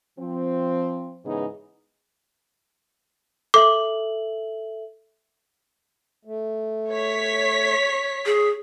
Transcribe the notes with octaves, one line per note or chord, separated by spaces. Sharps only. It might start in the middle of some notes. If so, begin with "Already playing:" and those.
F3 C4
G#2 C#3 E3 B3 D#4 G#4
A4 E5 D6 F#7
A3
C#5 B6
G#4